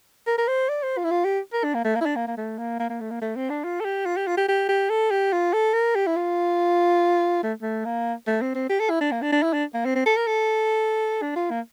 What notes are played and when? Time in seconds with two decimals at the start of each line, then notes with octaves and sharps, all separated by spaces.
0.27 A#4
0.38 A#4
0.48 C5
0.69 D5
0.83 C5
0.97 F4
1.04 E4
1.11 F4
1.25 G4
1.53 A#4
1.64 D4
1.74 A#3
1.84 A3
1.95 A#3
2.01 E4
2.06 D4
2.16 A#3
2.27 A#3
2.37 A3
2.58 A#3
2.79 A#3
2.89 A#3
3.01 A3
3.11 A#3
3.21 A3
3.36 C4
3.50 D4
3.64 F4
3.80 A4
3.85 G4
4.05 F4
4.17 G4
4.27 F4
4.37 G4
4.48 G4
4.69 G4
4.90 A4
5.11 G4
5.33 F4
5.53 A4
5.74 A#4
5.95 G4
6.07 E4
6.16 F4
7.43 A3
7.62 A3
7.85 A#3
8.27 A3
8.41 C4
8.55 C4
8.69 G4
8.80 A4
8.90 E4
9.01 D4
9.11 A#3
9.22 D4
9.32 D4
9.43 E4
9.53 D4
9.74 A#3
9.85 C4
9.95 C4
10.06 A4
10.17 A#4
10.27 A4
11.22 D4
11.36 F4
11.50 A#3